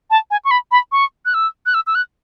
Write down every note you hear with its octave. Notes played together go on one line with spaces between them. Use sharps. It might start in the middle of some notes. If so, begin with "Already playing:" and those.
A5
G#5
C#6
B5
B5
C#6
F#6
E6
F#6
E6
E6
F#6